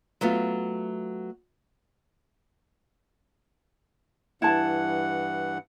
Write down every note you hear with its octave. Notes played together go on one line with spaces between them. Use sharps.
F#3 A3 B3 F4
G2 E3 E4 F#5 A5